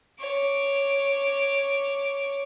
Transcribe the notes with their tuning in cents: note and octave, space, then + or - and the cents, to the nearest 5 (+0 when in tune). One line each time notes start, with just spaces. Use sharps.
C#5 +0 D6 +0